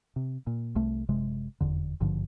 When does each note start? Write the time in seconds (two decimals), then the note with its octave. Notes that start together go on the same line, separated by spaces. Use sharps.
0.16 C3
0.47 A#2
0.75 C2 A3
1.08 F#1 C3 G#3
1.61 F1 E2 D3
2.00 G#1 G2 D3 F3